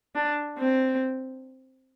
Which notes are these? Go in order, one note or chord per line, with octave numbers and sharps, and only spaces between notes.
D4
C4